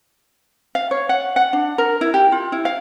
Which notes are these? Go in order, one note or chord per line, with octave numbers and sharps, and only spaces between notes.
F5
C#5
F#5
F#5
D4
A#4
E4
G4
F4
E4
F5